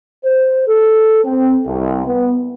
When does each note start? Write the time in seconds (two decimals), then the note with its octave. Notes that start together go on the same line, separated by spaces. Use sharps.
0.24 C5
0.68 A4
1.25 C4
1.66 C2
2.06 B3